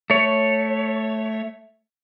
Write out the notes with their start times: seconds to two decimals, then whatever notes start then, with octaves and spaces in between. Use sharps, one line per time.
0.10 A3 C#5